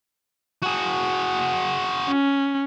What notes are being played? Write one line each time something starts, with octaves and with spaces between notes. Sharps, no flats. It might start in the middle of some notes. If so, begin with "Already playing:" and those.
F#4 G#4
C#4